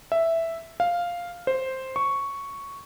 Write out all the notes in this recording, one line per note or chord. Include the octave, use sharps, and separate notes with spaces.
E5
F5
C5
C#6